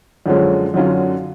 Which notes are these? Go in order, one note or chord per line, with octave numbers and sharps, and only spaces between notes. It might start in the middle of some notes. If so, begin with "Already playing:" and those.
F#2 D3 F3 G#3 C#4
F#2 D3 F#3 C#4 F4